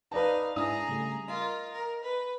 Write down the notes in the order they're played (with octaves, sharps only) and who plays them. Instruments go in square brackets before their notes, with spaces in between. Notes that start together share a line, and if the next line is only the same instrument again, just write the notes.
[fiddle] D#4 F5 [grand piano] B4 D5 A5
[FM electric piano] G#2 D4 E4 [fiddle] G#4 A#5 [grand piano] D#6
[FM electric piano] C#3 G3 A3
[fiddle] F4 A#4 [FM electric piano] D#5
[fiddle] A#4
B4